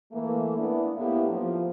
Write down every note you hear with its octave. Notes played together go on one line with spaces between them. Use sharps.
E3 A3 A#3
B3 D4 E4
A2 A#3 B3 E4 G4
F3